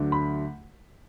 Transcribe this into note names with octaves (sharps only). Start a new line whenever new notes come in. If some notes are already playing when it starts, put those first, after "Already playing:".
Already playing: D2 D3 F#3 A3 D4
B5